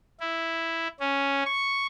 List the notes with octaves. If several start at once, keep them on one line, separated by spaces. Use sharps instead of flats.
E4
C#4
C#6